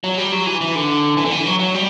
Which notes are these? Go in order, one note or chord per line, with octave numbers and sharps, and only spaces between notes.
F#3
G3
F#3
E3
E3
D3
E3
D3
E3
F#3
F#3
G3